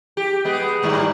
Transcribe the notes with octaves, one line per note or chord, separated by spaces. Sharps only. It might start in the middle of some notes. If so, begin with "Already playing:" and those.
G4
G#3 B3
D#2 G#2 G3